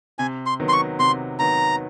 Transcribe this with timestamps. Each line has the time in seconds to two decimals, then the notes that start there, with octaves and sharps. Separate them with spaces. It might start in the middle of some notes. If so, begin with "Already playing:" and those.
0.19 C3 G#5
0.46 C6
0.60 D#3 F#3 B3
0.68 C6
0.73 C#6
0.99 C3 C6
1.39 D#3 F#3 B3 A#5